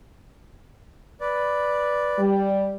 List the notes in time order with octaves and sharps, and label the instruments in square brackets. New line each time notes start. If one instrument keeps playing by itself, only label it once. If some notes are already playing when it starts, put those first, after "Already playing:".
[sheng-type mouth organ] B4 D5
[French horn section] G3